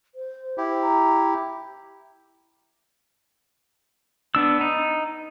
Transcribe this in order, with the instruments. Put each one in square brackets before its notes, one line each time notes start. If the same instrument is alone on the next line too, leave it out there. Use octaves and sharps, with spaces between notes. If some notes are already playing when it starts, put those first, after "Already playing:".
[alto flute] C5
[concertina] E4 G4
[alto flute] A#5
[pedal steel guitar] B3 D4 E6
D#4